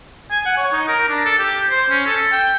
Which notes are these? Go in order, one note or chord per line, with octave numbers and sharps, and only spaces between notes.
G#5
F#5
C#5
D#4
A#4
D4
A4
G4
C5
C#4
A4
G5